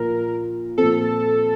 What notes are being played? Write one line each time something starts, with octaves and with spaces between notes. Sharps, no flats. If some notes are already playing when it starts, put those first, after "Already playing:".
Already playing: A#2 F3 A#4
A#2 F3 C4 A4